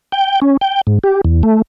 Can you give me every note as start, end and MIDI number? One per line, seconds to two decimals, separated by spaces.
0.12 0.40 79
0.42 0.57 61
0.61 0.81 79
0.87 0.99 44
1.04 1.21 67
1.25 1.43 40
1.43 1.62 57